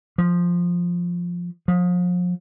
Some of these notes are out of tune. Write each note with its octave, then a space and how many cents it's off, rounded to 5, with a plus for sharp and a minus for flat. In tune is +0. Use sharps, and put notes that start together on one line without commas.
F3 +5
F3 +35